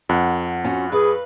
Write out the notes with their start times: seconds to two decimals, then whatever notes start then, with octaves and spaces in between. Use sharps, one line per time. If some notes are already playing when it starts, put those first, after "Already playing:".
0.09 F2 F#5
0.64 C#4 F4 F#4
0.92 G#4 B4 F5